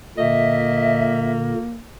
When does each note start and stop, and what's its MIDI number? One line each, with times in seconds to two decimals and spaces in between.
0.18 1.54 46
0.18 1.54 50
0.18 1.82 58
0.18 1.30 75
0.18 1.31 76